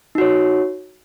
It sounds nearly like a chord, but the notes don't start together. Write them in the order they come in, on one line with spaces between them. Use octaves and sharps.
D#4 F#4 C#5